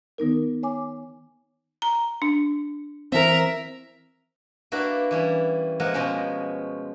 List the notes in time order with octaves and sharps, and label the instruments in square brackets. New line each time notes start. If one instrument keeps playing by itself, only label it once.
[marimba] D#3 B3 D#4 A#4
C#5 G#5 D6
[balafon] A#5
D4
[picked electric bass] E3 C4 [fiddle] A#4 E5
[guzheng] A#3 D4 E4 F#4 B4
E3 G3 C#4 E4
F3 G#3 A#3 F#5
B2 F3 G#3 C#4 G5